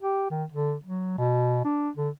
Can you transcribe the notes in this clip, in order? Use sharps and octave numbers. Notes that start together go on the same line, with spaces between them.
G4
D#3
D3
F#3
B2
D4
D3